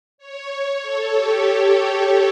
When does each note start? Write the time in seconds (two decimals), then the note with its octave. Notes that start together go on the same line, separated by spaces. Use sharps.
0.18 C#5
0.82 A4
1.13 G4